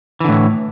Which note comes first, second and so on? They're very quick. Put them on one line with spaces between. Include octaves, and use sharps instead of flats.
E3 D3 A2